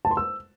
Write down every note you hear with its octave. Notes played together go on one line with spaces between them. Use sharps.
A5
C6
E6